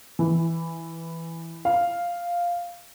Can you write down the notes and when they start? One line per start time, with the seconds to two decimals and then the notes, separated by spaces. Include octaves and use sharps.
0.19 E3
1.65 F5